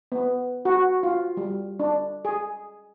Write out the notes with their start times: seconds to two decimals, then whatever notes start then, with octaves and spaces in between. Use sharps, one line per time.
0.12 B3
0.65 F#4
1.03 F4
1.37 G3
1.79 D4
2.25 G#4